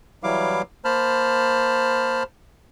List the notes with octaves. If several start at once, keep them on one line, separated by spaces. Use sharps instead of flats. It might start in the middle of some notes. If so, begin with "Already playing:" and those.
E3 F#3 G3 E4 F5 D6
A#3 C5 A5 B5 F6